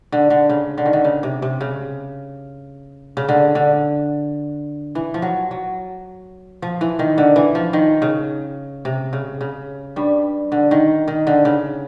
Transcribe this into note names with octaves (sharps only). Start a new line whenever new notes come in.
D3
D3
C#3
D3
D#3
D3
C#3
C3
C3
C#3
C#3
D3
D3
E3
F3
F#3
F#3
F3
E3
D#3
D3
E3
F3
D#3
C#3
C3
C#3
C#3
G2 G3
D3
D#3
D#3
D3
C#3